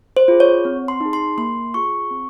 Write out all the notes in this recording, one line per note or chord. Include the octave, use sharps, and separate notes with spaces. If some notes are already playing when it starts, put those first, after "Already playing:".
C5
F4 G#4
C#5
C4
C6
D#4
G#4
C6
A#3 C6
F4 G#4 C#6
C4